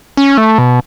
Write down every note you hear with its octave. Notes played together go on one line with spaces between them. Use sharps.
C#4
A3
B2